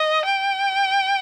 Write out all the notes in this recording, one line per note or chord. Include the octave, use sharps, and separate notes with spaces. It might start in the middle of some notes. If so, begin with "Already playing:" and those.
Already playing: D#5
G5